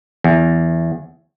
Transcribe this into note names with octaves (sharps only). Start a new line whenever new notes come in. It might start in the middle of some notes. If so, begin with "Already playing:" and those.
E2